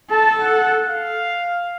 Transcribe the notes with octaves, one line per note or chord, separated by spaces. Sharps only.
A4 A5
F#5
F5